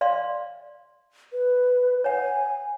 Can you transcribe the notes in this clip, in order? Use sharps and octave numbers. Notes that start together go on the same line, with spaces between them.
D5 F5 C6
B4
C#5 F#5 G#5